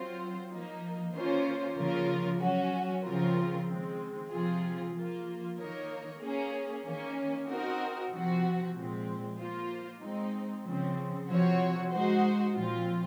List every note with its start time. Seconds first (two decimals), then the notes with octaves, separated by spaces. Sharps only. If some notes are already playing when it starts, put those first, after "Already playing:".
Already playing: F#3 C4 F4 C5
0.50 F3 A#3 D#4
1.13 D#3 A#3 C#4 F4 C5
1.77 C#3 F3 A#3 F4 A#4
2.40 F#3 C#4 F#4
3.03 C#3 F3 C4 F4 A#4
3.67 D#3 G#3 C4
4.31 C3 F3 C4 F4 G#4
4.94 F3 A#3 F4
5.58 D#3 A#3 D#4 A#4 C#5
6.20 A#3 C#4 G#4
6.84 D#3 A#3 C#4
7.48 C4 D#4 F#4 A#4
8.10 C3 F3 C4 F#4
8.74 A#2 F3 G#3 C4
9.38 A#3 F4 C5
10.00 G#3 C4 D#4
10.64 C#3 F3 C4
11.28 C3 F3 C4 F#4 C#5
11.91 G#3 D#4 F#4 C5
12.54 A#2 F3 C4 F4